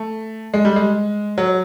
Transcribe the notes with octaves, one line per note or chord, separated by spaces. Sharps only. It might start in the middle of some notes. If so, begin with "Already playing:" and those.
Already playing: A3
G#3
G3
G#3
F#3